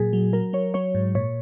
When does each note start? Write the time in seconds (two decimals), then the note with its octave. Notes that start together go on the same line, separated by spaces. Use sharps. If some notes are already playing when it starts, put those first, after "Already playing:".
Already playing: A#2 F#3 G#4
0.13 F#3
0.33 F#3 A#4
0.53 F#3 C#5
0.74 F#3 C#5
0.95 G#2
1.15 A#2 C#5